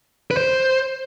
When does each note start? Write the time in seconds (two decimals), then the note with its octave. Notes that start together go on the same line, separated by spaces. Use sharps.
0.31 B4
0.37 C5